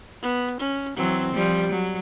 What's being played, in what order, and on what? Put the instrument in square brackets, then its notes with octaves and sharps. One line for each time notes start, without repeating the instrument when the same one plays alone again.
[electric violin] B3
C#4
[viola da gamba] E3 F#3 [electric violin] C4
[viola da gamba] F3 G3
F#3